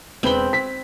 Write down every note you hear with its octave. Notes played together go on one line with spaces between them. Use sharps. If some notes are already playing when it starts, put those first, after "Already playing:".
E1 C4 B4 B5 G7
B6